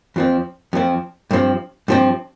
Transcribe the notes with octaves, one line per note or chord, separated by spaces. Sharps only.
F2 F3 C4
F2 F3 C4
G2 F3 C4
G2 F3 C4